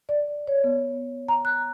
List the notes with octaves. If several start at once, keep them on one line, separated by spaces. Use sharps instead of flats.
D5
C#5
B3
A#5
F#6